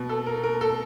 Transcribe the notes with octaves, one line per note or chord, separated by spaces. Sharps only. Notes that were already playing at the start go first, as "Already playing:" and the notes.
Already playing: B2
A4
A#4
A#4
A4